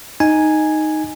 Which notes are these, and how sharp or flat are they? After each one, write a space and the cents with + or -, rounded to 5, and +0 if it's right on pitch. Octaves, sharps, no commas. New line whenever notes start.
D#4 +0 G#5 +0